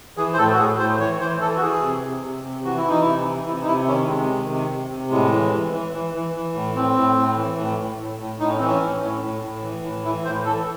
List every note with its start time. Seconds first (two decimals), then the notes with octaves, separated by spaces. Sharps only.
0.17 E3 G#4
0.34 C5
0.38 A2 A4
0.52 F#4
0.58 A2 G#4
0.79 A2 C5
1.00 E3 C#5
1.20 E3 C5
1.41 E3 A4
1.56 F#4
1.61 E3 G#4
1.82 C3
2.02 C3
2.23 C3
2.43 C3
2.64 E3 F#4
2.77 E4
2.85 E3 D#4
3.02 C3 E4
3.26 E3
3.46 C3 E4
3.61 D#4
3.67 C3 E4
3.87 D#3 C#4
4.08 C3 G#3
4.29 D#3
4.49 C3
4.69 C3
4.90 C3
5.11 A2 G#3
5.31 E3
5.52 E3
5.72 E3
5.93 E3
6.14 E3
6.34 E3
6.55 A2
6.75 A2 C4
6.96 A2
7.16 A2
7.37 E3
7.57 A2
7.78 A2
7.99 A2
8.20 A2
8.40 A2 D#4
8.48 C#4
8.58 E3 C4
8.66 C#4
8.81 A2
9.01 A2
9.23 A2
9.43 A2
9.63 E3
9.84 A2
10.05 E3 E4
10.25 A2 C5
10.45 E3 A4